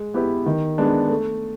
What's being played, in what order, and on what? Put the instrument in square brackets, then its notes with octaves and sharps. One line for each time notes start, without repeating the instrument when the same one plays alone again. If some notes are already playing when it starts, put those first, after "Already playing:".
Already playing: [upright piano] G#3
B3 E4 G4 B4
D#3
G#3 B3 D4
A3